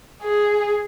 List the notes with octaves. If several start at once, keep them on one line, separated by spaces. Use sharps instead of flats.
G#4